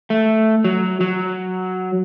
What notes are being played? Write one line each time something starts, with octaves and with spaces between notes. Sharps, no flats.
A3
F#3
F#3